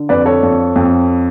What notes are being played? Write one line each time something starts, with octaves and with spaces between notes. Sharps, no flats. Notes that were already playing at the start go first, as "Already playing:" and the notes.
Already playing: D3
F2 B4 D5
A4 C#5
F2
F2